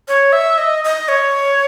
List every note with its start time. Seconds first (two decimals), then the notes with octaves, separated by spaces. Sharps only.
0.08 C#5
0.32 E5
0.58 D#5
0.84 D#5
1.08 C#5